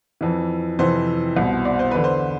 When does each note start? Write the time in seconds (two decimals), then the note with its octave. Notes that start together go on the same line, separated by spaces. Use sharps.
0.21 F2 E3
0.79 F2 C3 E3 C5
1.36 C2 B2
1.65 D5
1.79 C5
1.91 E2 D3 B4
2.04 C5